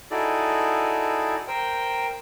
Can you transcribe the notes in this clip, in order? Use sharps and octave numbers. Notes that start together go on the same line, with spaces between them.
D#4 E4 F#4 G#4 A4 D5
A#4 C5 G5